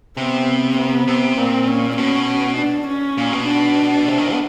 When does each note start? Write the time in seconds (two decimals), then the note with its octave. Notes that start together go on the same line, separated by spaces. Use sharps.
0.17 C3 B3
0.78 B3
1.07 C3
1.37 A#2 C4
1.67 C#4
1.97 B2 C#4
2.57 D4
2.87 C#4
3.18 A#2
3.33 B2
3.47 D4
4.08 C3
4.18 D#3
4.27 E3
4.33 B3